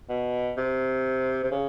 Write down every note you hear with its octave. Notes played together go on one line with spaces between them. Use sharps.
B2
C3
C3
C#3